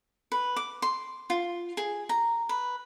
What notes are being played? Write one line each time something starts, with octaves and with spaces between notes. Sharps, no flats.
B4
D6
C6
F4
G#4
A#5
B4